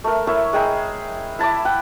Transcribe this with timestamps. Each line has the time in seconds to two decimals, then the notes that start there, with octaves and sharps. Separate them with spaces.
0.04 A3 A#4
0.27 E4 A#4 C#5 E5
0.53 G#3 G#4 G5 A#5
1.39 E4 A5 B5 D6
1.65 F#5 G5 B5